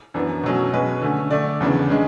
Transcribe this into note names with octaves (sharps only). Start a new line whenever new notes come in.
F#2 E3 B3 D4
B2 F#3 A3 C#4
B2 G#3 C#4 B4
D3 A3 C#4
D3 A3 D4 D5
E2 C#3 E3 B3 D4
C#3 G#3 D4